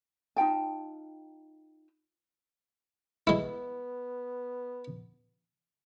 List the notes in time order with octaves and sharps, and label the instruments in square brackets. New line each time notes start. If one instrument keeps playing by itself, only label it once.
[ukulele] D#4 F4 G5 A5
[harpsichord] G#3 E4 [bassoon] B3